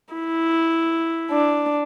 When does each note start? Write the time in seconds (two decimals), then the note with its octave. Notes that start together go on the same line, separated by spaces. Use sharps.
0.14 E4
1.31 D4